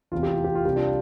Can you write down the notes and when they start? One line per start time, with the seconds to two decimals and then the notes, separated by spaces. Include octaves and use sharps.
0.11 F1 E2 C3 F4
0.23 G4
0.33 F4
0.44 G4
0.55 F4
0.65 C2 C3 G3 G4
0.75 D4 F4